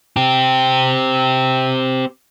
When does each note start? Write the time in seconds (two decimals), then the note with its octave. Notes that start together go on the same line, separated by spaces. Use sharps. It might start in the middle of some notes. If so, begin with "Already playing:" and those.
0.16 C4 G4